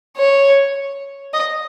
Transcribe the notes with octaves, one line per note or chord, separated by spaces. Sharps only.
C#5
D#5